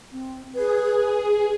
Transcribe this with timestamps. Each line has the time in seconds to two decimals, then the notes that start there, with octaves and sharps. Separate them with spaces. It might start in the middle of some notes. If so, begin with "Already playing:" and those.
0.12 C4
0.55 G#4 B4